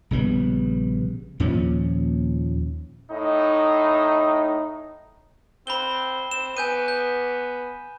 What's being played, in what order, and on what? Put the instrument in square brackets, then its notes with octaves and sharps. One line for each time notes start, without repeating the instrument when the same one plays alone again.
[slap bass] A#1 C#3 G3 B3
D#2 A#2 F3 C#4
[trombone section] A2 D#4
[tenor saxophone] C4 [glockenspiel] B5 G7
[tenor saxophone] C4 [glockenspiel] E7
[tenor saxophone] B3 [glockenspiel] G#5 G6 D#7
[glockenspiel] G6